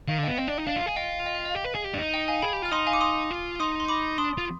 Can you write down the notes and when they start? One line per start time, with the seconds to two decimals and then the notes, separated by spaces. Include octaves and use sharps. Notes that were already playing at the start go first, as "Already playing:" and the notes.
0.08 D#3 F5
0.18 D3
0.23 D#5 G5
0.28 B3
0.37 C4 D#5 G5
0.48 D4
0.58 D#4
0.67 D4 F5
0.76 F4
0.86 G#4
0.96 F4 D#5 G5
1.26 D#5 G5
1.35 F5
1.45 D#5
1.55 G4
1.64 B4
1.75 G#4
1.84 G4
1.94 D4
1.99 D#4
2.14 D#5 G5
2.28 F5 G#5
2.42 G#4 G5 B5
2.53 G4
2.62 F4 F6
2.71 D#4 C6 D#6
2.87 F5 G#5
2.93 D6
3.01 C6 D#6
3.31 F4
3.60 D#4 C6 D#6
3.80 C6
3.88 B5 D6
4.18 D4 C6 D#6
4.38 F4